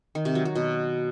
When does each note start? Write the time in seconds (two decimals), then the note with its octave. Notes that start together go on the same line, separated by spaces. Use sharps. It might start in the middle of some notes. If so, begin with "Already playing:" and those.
0.15 D#3
0.25 C3
0.35 F#3
0.45 F#3
0.55 B2